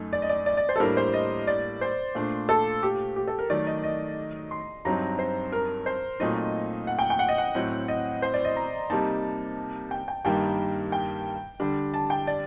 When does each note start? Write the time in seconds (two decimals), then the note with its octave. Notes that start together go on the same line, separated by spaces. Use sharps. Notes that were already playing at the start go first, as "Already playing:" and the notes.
Already playing: F#2 A3 D#4
0.13 D5
0.22 D#5
0.29 D5
0.46 D5
0.57 D5
0.69 C5
0.76 A4
0.80 A2 G3 A#3 D4 A#4
0.97 C5
1.14 D#5
1.47 D5
1.81 C5
2.15 A#2 A3 D4
2.49 A4
2.83 G4
3.16 G4
3.28 A4
3.39 A#4
3.50 D#3 F#3 A3 D5
3.66 D#5
3.84 D#5
4.51 C6
4.85 G2 F#3 C4 D#4 A#5
5.19 C5
5.52 A#4
5.86 C5
6.20 A#2 F#3 A3 C4 D#4 D#5
6.87 F#5
6.99 G5
7.10 G5
7.19 F#5
7.29 D#5
7.38 F#5
7.55 A2 F#3 C4
7.88 D#5
8.22 C5
8.34 D5
8.45 D#5
8.56 A#5
8.90 C3 G3 A#3 D#4 A5
9.91 G5
10.08 G5
10.25 G2 D#3 G3 A#3 D#4 G5
10.92 G5
11.60 D3 G3 D4
11.94 A5
12.10 G5
12.27 D5